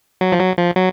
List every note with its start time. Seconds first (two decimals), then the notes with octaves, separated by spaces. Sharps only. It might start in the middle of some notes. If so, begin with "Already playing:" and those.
0.21 F#3
0.32 F3
0.39 F#3
0.58 F3
0.76 F#3